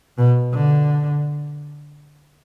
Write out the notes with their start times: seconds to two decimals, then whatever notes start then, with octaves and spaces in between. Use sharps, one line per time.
0.18 B2
0.54 D3